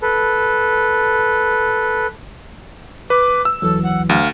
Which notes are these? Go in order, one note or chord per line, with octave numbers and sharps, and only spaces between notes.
A4 B4
B4 D6
E6
D#2 E3 F#3 A4
F#5
D2 F5